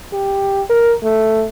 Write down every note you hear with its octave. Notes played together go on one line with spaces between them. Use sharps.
G4
A#4
A3